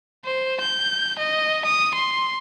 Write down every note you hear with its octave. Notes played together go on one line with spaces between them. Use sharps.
C5
G6
D#5
D#6
C6